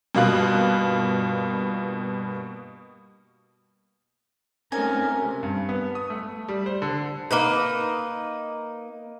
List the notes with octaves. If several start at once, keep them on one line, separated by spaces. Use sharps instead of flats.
G2 B2 A#3 F4 F#6
A3 C4 C#4 D#4 A#4 G#5
C3
G2
B3
D#6
A3
G3
C5
D3
A#3 D#4 B4